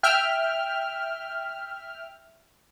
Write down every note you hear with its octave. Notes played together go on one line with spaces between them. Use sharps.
E5 G5 F6